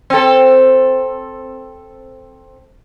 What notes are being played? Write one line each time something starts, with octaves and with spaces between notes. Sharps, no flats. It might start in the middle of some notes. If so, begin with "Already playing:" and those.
C4 A4